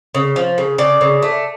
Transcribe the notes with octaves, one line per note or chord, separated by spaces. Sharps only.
C#3
F3
C#3
C#3 D5
C#3
A3